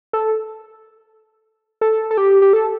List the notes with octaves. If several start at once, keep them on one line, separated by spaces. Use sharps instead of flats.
A4
A4
A4
G4
G4
A4